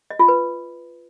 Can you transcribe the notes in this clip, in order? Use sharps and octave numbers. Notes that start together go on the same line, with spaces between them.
D#5
F4
B4